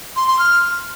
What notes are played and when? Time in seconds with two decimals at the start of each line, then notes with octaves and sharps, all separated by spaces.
0.16 C6
0.28 C6
0.39 F6